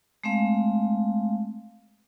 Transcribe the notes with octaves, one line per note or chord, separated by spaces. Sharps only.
G#3 A3 C4 F5